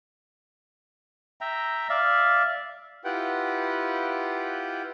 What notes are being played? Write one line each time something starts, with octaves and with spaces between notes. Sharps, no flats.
E5 G5 A#5
D5 E5 F5
E4 F4 G4 B4 F#5 G5